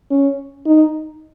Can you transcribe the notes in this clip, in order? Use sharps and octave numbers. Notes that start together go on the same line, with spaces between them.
C#4
D#4